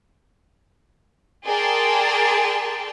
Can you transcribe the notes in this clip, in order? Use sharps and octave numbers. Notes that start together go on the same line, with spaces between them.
G#4 A#4 D5 G5 A5 C6